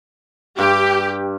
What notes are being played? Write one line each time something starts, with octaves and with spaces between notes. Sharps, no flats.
G2 G4